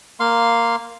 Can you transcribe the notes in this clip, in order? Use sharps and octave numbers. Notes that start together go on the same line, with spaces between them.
A#3 F5 C6